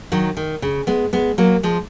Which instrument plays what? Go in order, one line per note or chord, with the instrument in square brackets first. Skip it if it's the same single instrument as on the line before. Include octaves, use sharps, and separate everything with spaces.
[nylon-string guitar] D#3 F#3
D#3
C#3
G#3 B3
G#3 B3
F#3 A#3
F3 G#3